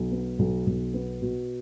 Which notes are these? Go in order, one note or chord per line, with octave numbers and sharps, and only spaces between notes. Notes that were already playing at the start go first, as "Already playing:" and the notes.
Already playing: B1
B3
B1
B1
B3
B2